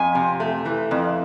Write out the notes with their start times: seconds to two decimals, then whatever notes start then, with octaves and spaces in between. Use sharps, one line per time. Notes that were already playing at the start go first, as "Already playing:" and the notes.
Already playing: F2 G#5
0.15 C3
0.40 A3
0.65 E3
0.91 F2